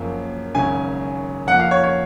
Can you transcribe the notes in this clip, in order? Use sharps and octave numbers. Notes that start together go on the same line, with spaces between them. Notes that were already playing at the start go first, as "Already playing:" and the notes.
Already playing: F#1 F#2 F3 A#3
G#1 F#2 C#3 G#5
F2 F3 A#3 F#5
F5
C#5
C#5